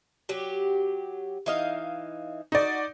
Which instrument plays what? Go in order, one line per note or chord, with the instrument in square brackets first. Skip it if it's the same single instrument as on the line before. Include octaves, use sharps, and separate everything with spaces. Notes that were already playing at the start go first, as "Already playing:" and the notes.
[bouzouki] F#3 G4
E3 D#4 F5
[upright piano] D#4 D5 [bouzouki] F#4